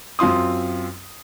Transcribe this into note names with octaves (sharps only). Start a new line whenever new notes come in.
F#2 C4 F4 C6 D#6